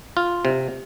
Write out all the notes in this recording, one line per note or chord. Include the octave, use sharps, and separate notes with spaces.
F4
C3